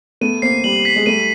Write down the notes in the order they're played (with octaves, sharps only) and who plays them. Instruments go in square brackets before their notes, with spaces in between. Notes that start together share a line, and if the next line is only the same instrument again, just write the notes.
[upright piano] A3 B3 [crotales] D#7
[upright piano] A#3 C4 [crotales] C7
[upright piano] G3 [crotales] F#7
[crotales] B6
[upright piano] G#3
[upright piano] G3 A3 [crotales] D#7